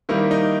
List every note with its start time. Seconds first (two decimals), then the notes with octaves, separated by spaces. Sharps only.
0.09 D#3 G3 A#3 E4
0.31 D#4